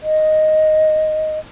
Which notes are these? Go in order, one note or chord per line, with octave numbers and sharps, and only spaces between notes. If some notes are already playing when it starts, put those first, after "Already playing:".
D#5